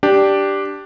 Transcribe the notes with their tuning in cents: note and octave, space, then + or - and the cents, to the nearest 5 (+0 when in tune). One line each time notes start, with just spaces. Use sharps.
D4 +0 G4 +0